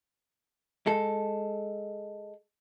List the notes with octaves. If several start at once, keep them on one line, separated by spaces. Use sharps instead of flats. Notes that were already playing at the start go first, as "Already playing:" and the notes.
G#3 A4